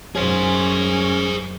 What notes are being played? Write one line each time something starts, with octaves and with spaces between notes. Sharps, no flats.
F#2 C#4 G#4 C5